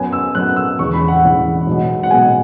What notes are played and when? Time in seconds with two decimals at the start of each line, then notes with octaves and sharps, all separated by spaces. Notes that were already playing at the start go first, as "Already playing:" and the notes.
Already playing: F#2 F#3 B3 G#5
0.13 E6
0.35 F#2 F#3 B3 F#6
0.56 E6
0.79 E1 E2 C#3 C#6
0.94 B5
1.08 F#5
1.23 E1 E2 C#3
1.67 B1 B2 G#3 B3
2.03 F#5
2.11 B1 B2 G#3 B3 G#5